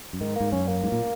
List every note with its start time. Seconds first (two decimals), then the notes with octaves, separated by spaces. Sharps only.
0.13 F#2
0.20 G#2 D#3
0.35 A#3
0.41 G#2
0.52 F#2 C#4
0.67 A#3
0.83 G#2
0.92 A#2